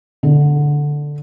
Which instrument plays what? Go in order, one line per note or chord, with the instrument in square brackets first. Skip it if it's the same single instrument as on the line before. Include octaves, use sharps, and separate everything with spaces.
[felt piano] D3